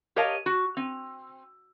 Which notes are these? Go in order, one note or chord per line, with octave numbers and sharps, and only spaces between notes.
G4 A#4 C#5 D#5 F5 A5
F#4
C4